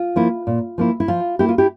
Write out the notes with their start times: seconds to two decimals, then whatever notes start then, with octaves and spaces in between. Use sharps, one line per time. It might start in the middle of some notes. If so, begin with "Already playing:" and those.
Already playing: F4
0.16 F3 A#3 E4
0.47 A#2
0.78 F3 A#3 E4
1.00 E4
1.08 F3 F4
1.39 A#3 E4 G4
1.49 F4
1.58 E4 G4